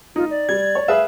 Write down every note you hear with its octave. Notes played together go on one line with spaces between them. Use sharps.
D#4 F4
D5
G3 G#6
C#5
G#4 B4 E5 F5